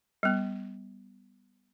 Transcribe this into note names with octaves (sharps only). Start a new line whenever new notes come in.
G3 B3